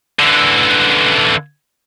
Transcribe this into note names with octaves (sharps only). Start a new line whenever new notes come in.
D3 E3